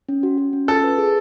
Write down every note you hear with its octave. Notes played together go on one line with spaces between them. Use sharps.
C#4
F#4
F#4
C#4
F4 A4
B4
G#4